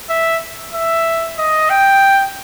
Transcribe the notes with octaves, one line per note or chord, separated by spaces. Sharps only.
E5
E5
D#5
G5